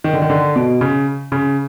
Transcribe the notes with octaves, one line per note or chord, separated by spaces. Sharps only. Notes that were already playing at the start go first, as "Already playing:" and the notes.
D#3
D3
D#3
D3
B2
C#3
C#3